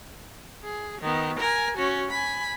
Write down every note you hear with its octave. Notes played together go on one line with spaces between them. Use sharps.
G#4
D#3 B3
A#4 G#5
C#4 F#4
G#5 B5